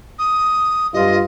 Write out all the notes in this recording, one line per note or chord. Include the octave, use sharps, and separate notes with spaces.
D#6
G2 F4 D#5